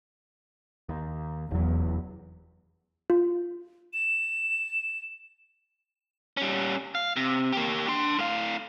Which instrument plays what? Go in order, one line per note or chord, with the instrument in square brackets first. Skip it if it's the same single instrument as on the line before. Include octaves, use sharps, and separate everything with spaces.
[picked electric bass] D#2
[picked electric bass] F1 F#3 [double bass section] E2
[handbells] F4
[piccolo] E7
[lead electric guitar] G3 C#4
F5
C3
A#3 G4
D4 C6
A2 F5